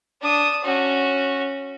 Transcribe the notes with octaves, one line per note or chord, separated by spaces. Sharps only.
D4 D#6
C#4 F#4